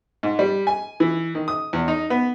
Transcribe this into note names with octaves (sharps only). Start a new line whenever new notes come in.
G#2
G3
G#5
E3
D#3
D#6
E2
D#4
B3